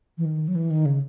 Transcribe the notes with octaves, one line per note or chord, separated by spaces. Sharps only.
E3
D#3
F#3
E3
D#3
C#3